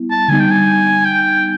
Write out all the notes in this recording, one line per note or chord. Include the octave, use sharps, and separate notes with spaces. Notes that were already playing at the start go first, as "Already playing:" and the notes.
Already playing: G3 B3 E4
A5
D3 G3 B3 D#4 G#5
G5
G#5
G5